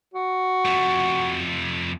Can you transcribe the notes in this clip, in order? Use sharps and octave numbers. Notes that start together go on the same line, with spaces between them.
F#4
F2 A3